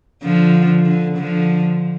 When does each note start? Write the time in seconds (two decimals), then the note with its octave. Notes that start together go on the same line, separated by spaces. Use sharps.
0.23 D3 F3
0.86 D3
1.18 D3 F3